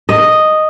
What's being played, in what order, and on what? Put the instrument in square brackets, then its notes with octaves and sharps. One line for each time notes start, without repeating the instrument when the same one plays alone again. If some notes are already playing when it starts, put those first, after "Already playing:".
[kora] D#5